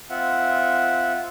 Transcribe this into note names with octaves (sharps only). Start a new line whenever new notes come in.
C4 F4 E5 F#5